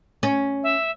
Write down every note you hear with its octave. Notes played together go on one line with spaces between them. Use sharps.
C#4
E5